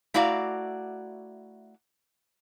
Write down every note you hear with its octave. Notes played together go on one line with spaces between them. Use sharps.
A3 E4 F#4 D5 F5 A#5